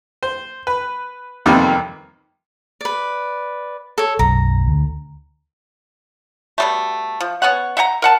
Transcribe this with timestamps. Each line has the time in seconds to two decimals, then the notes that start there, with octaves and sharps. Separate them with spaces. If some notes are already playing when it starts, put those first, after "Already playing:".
0.23 C5
0.67 B4
1.46 F2 C3 D#3 G3 A#3 B3
2.81 B4 D5
3.98 A4 C#5
4.19 B1 F#2 A#5
4.66 D2
6.58 B2 G3 A3
7.20 F3
7.42 B3 C#4 C#5 F#5
7.77 E5 F#5 G5 A#5
8.02 A#4 F#5 A5